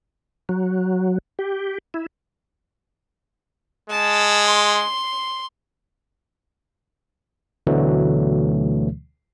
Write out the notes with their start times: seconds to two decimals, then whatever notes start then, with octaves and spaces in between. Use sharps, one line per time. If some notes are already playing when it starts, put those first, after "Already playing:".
0.49 F#3
1.39 G4
1.94 E4
3.90 G#3 A5
4.45 C6
7.67 D2 B2 D3 E3 F#3 A3